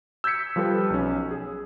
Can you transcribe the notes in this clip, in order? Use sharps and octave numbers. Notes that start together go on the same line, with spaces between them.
E6 G6 G#6 B6 C#7
F3 G3 F4 A4 B4
B1 C#4
G#4